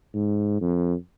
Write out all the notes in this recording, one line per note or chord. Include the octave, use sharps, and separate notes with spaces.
G#2
F2